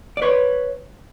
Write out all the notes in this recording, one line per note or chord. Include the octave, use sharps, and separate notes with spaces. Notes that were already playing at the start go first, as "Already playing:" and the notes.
D5
B4 C#5